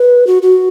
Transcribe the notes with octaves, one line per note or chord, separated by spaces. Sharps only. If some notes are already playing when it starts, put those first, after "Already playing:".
Already playing: B4
F#4
F#4